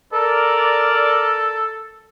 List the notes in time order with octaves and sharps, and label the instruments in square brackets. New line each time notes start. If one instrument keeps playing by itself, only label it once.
[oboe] A4 [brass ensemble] A#4 D5